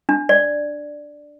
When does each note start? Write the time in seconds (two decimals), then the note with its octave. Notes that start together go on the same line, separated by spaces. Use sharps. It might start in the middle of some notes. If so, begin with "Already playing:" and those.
0.09 D4
0.29 D5